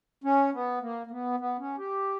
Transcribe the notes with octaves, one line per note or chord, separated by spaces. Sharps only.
C#4
B3
A#3
A#3
B3
B3
C#4
G4